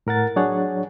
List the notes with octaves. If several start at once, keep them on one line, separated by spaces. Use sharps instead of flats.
A2 A#4 F#5 A6
F#3 D4 G#4 C#5 F#5